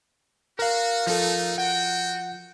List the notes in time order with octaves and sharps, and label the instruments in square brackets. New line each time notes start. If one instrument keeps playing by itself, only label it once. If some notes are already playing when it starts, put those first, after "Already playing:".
[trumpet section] F#4 [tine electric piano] A#4 F5
[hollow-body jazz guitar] F3 A4 [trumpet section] A3 D#4
[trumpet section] F#4 G5 [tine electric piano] F#5